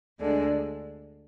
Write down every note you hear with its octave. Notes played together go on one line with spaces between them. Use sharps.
D2 D3 G#3 D4